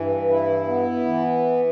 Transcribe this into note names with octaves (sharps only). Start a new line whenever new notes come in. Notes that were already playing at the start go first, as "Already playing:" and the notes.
Already playing: G2 E3
E4
B3
E3